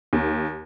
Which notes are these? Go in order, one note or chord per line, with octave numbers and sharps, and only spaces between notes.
D#2